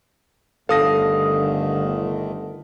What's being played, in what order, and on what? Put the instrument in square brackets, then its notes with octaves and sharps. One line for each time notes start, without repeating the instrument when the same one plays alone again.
[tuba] G1 [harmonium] D3 D#3 A3 [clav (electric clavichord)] A4 [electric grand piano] F5 D#6 A#6